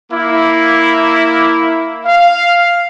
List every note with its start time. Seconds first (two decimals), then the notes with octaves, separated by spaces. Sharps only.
0.11 A#3 E4
2.05 F5